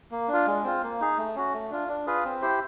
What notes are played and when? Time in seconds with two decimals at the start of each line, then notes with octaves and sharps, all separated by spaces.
0.11 A#3
0.28 D4 F4
0.47 G#3
0.64 C4 F4
0.83 A#3
1.00 D#4 G#4
1.18 A3
1.36 C#4 F#4
1.53 A3
1.71 D4 F4
1.88 D4
2.07 F4 G#4 B4
2.25 C4
2.42 E4 G4 C5